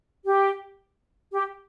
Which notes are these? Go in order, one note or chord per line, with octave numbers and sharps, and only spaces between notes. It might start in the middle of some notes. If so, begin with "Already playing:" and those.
G4
G4